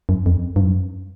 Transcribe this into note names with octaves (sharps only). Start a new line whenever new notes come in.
F#2
F2
G2
F#2